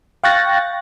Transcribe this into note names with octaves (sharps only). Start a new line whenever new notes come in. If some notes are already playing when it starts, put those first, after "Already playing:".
F5 G5 C#6 F#6 A6 A#6